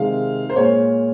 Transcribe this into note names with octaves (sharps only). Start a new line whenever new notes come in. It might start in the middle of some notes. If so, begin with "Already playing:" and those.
Already playing: C3 D#3 G#3 F5
C5
A#2 G#3 C#5